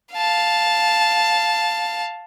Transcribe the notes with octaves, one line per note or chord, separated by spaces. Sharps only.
F5 A5